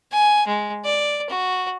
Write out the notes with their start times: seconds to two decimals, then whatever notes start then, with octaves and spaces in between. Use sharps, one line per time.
0.12 G#5
0.48 G#3
0.84 D5
1.29 F#4